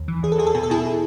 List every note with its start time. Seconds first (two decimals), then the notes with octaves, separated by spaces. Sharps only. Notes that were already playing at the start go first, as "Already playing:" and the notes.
Already playing: D#2
0.08 E3
0.23 E2 G#4
0.32 A4
0.38 E2 G#4
0.47 A4
0.55 B2 G#4
0.63 A4
0.70 B2 E4 G#4